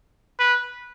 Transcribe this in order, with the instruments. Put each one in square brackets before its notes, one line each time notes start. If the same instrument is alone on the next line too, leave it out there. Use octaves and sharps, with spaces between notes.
[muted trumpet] B4